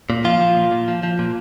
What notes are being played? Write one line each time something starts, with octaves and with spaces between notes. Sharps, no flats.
A#2
F3 F4
F3
A#2
A#2
F3
F3
A#2